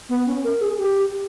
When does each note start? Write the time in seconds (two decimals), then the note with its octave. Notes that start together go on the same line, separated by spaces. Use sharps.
0.09 B3
0.26 C#4
0.44 A#4
0.60 G#4
0.78 G4